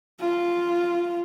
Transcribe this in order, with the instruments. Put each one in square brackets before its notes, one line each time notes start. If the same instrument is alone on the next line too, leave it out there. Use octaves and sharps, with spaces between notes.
[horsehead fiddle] F4